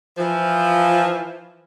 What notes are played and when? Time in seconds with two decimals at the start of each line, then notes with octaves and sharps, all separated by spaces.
0.18 E3 F3